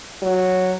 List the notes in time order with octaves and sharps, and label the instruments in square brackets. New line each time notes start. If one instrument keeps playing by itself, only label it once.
[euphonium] F#3